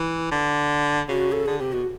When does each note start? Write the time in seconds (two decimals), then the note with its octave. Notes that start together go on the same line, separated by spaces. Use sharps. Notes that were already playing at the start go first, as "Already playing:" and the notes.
Already playing: E3
0.31 D3
1.09 C#3 F#4
1.32 A4
1.46 D3 G#4
1.59 C3 G4
1.73 B2 F#4